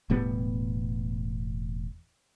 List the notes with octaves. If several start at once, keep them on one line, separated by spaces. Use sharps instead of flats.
E1 A2 G3 B3